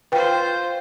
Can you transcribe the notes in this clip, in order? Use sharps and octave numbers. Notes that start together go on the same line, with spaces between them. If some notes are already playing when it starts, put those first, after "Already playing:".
F4 B4 C5 G5